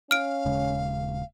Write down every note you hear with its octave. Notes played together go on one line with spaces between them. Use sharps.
C#4 F5 F6 D7
D#1 C#3 G#3